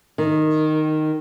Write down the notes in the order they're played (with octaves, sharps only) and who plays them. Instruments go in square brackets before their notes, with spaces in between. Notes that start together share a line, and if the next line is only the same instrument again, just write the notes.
[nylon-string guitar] D#3